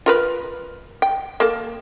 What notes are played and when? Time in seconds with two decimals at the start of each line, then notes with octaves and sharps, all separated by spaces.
0.06 F4 A#4 B4
1.02 G5
1.40 A#3 A4